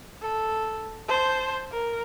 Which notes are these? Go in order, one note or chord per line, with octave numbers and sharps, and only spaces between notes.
A4
C5 A5
A#4